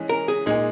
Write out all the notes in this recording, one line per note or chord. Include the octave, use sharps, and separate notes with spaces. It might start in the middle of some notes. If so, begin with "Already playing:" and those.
Already playing: E3 G#3 C#4
A#4
G#4
A#2 G#3 D#4 G#4